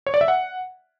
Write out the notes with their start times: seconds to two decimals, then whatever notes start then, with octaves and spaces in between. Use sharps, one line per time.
0.07 C#5
0.14 D5
0.21 E5
0.28 F#5